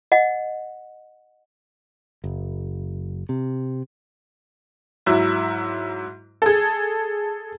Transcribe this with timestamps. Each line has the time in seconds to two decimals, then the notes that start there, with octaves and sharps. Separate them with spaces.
0.12 D#5 F#5
2.24 F#1
3.29 C3
5.06 G#2 F#3 E4
6.42 G#4 A4